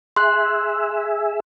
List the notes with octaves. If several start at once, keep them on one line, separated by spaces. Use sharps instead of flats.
G#4 E5 C6 F#6